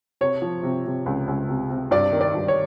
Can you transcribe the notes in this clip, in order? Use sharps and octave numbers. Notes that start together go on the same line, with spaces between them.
C3 C#5
F3
C3
C3
C#2
C#2
C3
C3
G2 D5
D#3
D5
G2
C#5